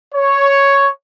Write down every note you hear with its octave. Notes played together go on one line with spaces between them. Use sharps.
C#5